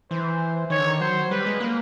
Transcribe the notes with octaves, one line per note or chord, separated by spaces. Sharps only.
E3 C5
D#3 C#5
D3
D#3
F#3 C5
G3 B4
G#3
A#3